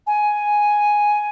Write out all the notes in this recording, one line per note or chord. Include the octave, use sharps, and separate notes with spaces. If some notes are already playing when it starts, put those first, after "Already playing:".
G#5